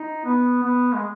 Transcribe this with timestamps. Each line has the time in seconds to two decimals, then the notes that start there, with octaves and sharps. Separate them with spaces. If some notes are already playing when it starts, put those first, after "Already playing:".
Already playing: D#4
0.25 B3
0.63 B3
0.94 G#3